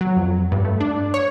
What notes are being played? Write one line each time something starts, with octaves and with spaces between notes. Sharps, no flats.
F#3
F2
G2
A3
D4
C#5